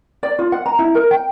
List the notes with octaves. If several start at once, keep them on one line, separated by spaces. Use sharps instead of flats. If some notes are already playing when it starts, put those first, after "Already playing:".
D5
F4
F#5
A#5
E4
A#4
G5